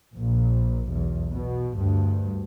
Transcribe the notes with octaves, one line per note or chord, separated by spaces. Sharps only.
A#1 A#2
B1 E2
B2
D2 G2